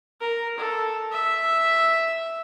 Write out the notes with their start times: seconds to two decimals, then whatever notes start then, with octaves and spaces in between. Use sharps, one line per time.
0.21 A#4
0.58 A4
1.12 E5